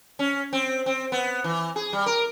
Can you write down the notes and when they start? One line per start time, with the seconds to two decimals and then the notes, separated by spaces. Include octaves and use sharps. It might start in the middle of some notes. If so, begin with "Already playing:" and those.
0.19 C#4
0.53 C4
0.86 C4
1.12 B3
1.44 E3
1.76 G#4
1.93 G3
2.06 A#4